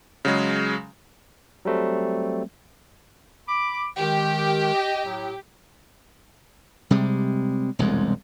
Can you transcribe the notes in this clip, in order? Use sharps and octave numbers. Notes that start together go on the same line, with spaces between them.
C#3 F#3 G#3
F#3 G3 A3 C4
B5 D6
D#3 G#3 G4
D#5
A2 F#3
C3 G3 G#3
E1 C2 F2 G#3